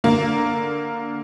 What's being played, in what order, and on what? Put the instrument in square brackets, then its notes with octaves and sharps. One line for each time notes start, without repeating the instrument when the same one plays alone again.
[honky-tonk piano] D3 A#3